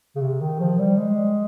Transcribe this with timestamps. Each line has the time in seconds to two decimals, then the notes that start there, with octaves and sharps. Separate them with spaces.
0.15 C#3
0.21 C3
0.41 D#3
0.60 F3
0.79 G3
0.97 G#3